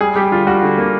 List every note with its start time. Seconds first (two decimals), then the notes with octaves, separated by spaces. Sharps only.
0.01 G3 G#4
0.16 G3 G4
0.31 D3 F4
0.47 G3 F#4
0.62 D3
0.78 A#3